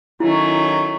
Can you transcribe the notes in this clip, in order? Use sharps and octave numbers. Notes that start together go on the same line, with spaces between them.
D#3 F#3 A3 C#4 E4